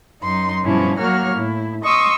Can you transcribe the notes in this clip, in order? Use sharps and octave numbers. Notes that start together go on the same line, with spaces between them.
F#2 D#4 C6
G2 B2 F3 C#4 E4
F#3 A#3 F#4 C#5 F6
A2 E4
D#5 C6 C#6 D#6 E6